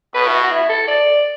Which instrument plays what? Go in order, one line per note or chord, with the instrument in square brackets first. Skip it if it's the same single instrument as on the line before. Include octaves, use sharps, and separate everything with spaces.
[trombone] B2 [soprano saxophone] B4
[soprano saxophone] E4
F#4
F#4
E4
A4
D5